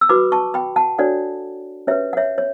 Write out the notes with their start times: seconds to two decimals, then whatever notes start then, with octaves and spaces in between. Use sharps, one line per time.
0.01 E6
0.09 F#4 B4 B5 D6
0.32 A5 C#6
0.54 G5 B5
0.76 F#5 A5
0.98 D4 F#4 A4 C#5 D5 F#5
1.87 C#4 G4 B4 C#5 E5
2.13 F#5
2.17 C#5 E5
2.38 C#5